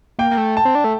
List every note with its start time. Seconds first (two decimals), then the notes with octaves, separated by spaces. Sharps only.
0.19 A#3 G5
0.31 A#3
0.38 A3
0.57 A5
0.65 C4
0.75 D4
0.84 A3